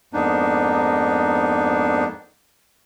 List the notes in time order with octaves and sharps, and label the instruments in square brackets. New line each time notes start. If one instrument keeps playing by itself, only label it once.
[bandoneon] F2 G#2 A#3 B3 D4 D#4